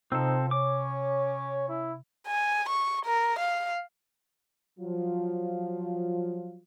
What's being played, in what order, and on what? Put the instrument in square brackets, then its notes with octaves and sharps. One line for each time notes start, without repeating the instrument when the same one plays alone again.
[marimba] C3 [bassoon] F3 [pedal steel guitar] C4 A4 [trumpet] D#4
[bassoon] C#4 [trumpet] C#5 [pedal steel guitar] D6
[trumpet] E4
[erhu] G#5
C#6
A#4
F5
[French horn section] F3 F#3 F4